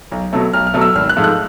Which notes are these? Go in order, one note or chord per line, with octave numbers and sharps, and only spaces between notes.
B1
B2 F#3 A3
B1 F6
F6
B2 F#3 A3
E6
G#1 F6
F#6
G#2 F3 A3
F#6